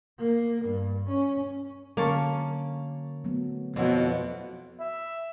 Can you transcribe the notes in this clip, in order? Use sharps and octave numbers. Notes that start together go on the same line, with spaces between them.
A#3
G2
C#4
D3 F#3 A#3 C#4 A5 C#6
F#3 A3 B3
F2 B2 F3 E4 C#5 F#5
E5